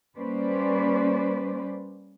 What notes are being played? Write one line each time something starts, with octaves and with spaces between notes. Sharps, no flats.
G3 A#3 C#4 B4 C5 D5